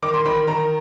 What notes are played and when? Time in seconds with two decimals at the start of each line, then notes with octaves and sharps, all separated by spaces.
0.02 D#3 D6
0.14 C6
0.25 D#3 B5
0.47 D#3 A#5